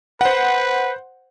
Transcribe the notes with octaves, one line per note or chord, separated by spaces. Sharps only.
B4 C5 F#5